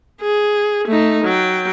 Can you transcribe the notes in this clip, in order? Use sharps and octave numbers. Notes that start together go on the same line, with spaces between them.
G#4
A3 D#4
F#3 G5